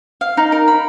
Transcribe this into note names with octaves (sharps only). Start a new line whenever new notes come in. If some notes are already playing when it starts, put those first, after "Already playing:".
F5
D#4
A#4
B5